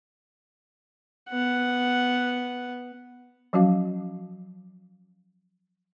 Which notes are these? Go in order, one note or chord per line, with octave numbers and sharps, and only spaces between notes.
B3 F#5
F3 F#3 C#4 F#4 F5